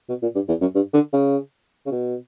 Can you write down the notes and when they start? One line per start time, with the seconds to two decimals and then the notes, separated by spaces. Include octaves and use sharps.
0.09 B2
0.22 A#2
0.35 G2
0.49 E2
0.61 F#2
0.75 G2
0.94 D3
1.13 C#3
1.86 C#3
1.92 B2